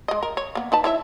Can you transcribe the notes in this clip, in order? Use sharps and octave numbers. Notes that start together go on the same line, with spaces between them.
G#3 D#5
A#4
C#5
A#3 B3
D#4 B4 A5
E4 C#5 E5